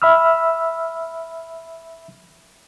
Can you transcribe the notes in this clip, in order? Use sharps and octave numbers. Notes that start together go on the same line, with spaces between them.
E5 B5 E6 F6